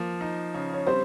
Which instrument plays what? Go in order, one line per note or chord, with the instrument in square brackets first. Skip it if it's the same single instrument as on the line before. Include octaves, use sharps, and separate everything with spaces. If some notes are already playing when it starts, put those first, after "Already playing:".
Already playing: [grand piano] F3 [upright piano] A#3
[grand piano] D#4
C#3
[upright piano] C#5
[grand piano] G3 [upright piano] C4 C5